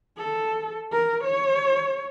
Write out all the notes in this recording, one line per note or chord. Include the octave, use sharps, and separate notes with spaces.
A4
A#4
C#5